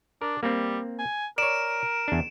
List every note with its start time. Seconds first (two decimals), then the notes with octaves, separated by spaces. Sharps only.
0.22 D4 A#4
0.43 G3 A#3 C4
0.99 G#5
1.38 A#4 C#5 D5 D7 E7
2.08 E2 D4